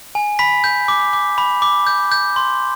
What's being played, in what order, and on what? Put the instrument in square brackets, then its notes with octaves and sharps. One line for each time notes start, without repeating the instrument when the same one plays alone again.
[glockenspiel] G#5
B5 B6
G6
D6
D6
B5
D6
G6
G6
C6